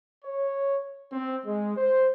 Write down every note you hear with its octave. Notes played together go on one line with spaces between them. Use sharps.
C#5
C4
G#3
C5